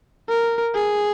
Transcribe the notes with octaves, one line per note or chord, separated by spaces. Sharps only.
A#4
G#4